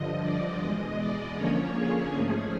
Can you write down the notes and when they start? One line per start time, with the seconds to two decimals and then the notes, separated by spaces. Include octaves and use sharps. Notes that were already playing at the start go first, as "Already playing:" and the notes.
Already playing: G2 D3 F3 D#5
0.20 D5
0.59 E2 B2 G#3 D#5
0.98 D5
1.36 D3 F3 A#3 C#4 C#5
1.75 G#4
2.13 G#2 F3 A3 C#4 G#4